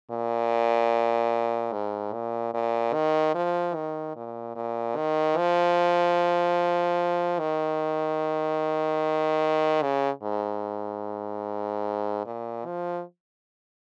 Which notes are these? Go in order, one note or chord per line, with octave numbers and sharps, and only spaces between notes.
A#2
G#2
A#2
A#2
D#3
F3
D#3
A#2
A#2
D#3
F3
D#3
C#3
G#2
A#2
F3